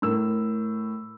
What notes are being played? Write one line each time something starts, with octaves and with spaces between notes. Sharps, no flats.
A2 A#4 E6